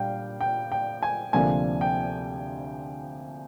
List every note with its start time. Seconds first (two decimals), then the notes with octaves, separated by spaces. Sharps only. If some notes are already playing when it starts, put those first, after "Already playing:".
Already playing: A#2 G3 D4 F5 G5
0.41 G5
0.72 G5
1.03 G#5
1.33 D2 C3 F3 A#3 D4 G#5
1.81 G5